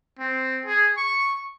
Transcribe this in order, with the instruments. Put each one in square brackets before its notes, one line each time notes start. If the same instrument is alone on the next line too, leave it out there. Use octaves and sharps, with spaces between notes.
[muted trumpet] C4
G#4
C#6